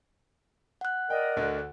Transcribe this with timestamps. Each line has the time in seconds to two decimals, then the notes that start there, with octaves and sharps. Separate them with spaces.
0.81 F#5 F#6
1.10 A#4 D5 D#5 G5
1.36 D2 D3